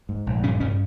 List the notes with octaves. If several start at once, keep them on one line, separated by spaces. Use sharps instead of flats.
G#2
A#1
G2 C#3 C#4
G2 C#3 C#4